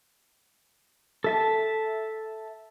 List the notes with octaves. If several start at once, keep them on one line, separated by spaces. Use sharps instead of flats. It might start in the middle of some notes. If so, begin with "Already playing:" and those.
A4 E5 A5